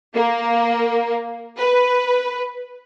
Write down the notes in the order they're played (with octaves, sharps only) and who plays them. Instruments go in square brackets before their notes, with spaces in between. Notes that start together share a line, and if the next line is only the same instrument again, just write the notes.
[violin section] A#3
B4